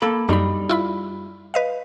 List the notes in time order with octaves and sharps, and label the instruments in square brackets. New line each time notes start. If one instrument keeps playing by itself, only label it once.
[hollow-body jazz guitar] A#3 A4 B5
[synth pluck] F#2 B5 [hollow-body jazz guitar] G3 D4 D#4
[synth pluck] E4 F4 B5
B4 D#5 F5